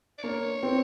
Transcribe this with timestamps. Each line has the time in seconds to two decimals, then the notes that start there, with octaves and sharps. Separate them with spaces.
0.18 D5
0.23 A#3 C#5
0.63 C4